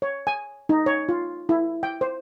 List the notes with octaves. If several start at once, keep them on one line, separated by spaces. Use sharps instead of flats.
C#5
G#5
D#4
C#5
F4
E4
G5
C5